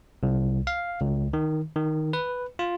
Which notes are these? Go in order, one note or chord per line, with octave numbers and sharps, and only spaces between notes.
C2
F5
C#2
D#3
D#3
B4
F4